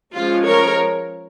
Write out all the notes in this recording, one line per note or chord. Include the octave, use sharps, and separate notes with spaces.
F3 G#3 C#4 F4
A#4 C#5